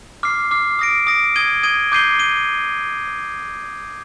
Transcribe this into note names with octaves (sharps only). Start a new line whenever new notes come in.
D6 F6 C7
D6 F6 C7
D#6 A#6 D7
D#6 A#6 D7
D#6 G#6 D#7 G7
D#6 G#6 D#7 G7
D6 G6 C7 D#7 G7
D#7 G7